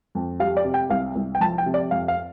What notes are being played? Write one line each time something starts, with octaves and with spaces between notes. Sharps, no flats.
F2
G3 F5
D5
C3
G5
C2 F5
C2
G5
F3 A5
G5
C3
D5
F2 F5
F5